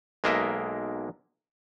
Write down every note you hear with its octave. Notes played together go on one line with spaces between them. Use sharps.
B1 G#3 A#3 A#4 D#5 E5